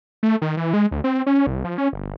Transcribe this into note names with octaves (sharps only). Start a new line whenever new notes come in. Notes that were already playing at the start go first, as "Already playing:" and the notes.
A3
D#3
E3
G#3
D2
C4
C#4
C2
F3
C#4
G1